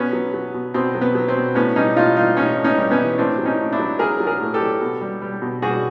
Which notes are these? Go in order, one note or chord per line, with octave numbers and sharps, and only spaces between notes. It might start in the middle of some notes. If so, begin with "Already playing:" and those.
Already playing: B2 B3 C#4
F#3
F#3
B2
B2 C4
F#3
B3
F#3
C4
B2
A2 B3 C#4
G3 C#4 D#4
A2 D#4 F4
G3 D#4 F4
A2 C#4 D#4
A2
C#4 D#4
G3
B3 C#4
E3
A2 C4 D4
F#3
C#4 D#4
A2
D4 E4
F#3
F#3 G#4 A#4
F#3
G#4 A#4
A2
G4 A4
F#3
B2
G3
G3
B2
G3 F#4 G#4